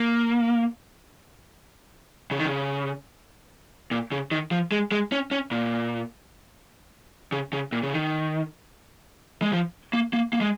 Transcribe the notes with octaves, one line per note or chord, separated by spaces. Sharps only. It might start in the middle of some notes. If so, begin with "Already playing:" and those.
Already playing: A#3
C#3
D#3
C#3
A#2
C#3
D#3
F3
G#3
G#3
C#4
C#4
A#2
C#3
C#3
A#2
C#3
D#3
G#3
F3
A#3
A#3
A#3
G#3